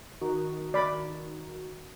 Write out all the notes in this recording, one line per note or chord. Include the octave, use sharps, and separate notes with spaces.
D#3 D#4 F#4
D5 B5